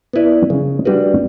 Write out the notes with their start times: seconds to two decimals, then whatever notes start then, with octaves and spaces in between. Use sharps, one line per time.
0.13 B3 E4 B4 D5
0.50 C#3
0.85 G3 D4 F#4 B4